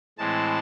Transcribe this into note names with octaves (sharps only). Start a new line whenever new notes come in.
A2 E3 G#3 C4 A5